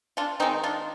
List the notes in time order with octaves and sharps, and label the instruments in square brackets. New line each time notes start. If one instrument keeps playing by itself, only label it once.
[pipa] D4 F4
D#3 G#3 C4 D#4
D4 F4